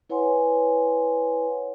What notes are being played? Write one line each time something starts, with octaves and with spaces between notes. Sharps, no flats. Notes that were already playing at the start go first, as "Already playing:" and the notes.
E4 B4 C#5 F#5 G#5 C6